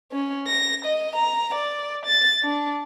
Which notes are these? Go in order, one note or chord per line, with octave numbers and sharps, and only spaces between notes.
C#4
A#6
D#5
A#5
D5
A6
D4